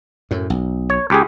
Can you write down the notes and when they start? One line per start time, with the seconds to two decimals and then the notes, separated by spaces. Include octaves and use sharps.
0.31 F#2 A2
0.50 B1
0.90 C#5
1.10 C#2 G4 G#4